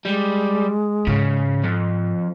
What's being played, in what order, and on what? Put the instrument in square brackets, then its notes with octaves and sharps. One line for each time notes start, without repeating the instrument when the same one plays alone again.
[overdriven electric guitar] G3 [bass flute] G#3
[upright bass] G#2 [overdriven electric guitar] C#3
[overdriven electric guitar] F2